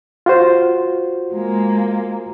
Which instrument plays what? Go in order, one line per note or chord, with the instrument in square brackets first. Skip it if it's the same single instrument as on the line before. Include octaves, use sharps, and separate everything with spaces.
[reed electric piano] F4 F#4 C5
[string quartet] G#3 A#3